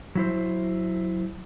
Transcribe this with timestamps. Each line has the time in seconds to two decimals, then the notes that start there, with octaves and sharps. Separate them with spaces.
0.15 F#3 E4 C5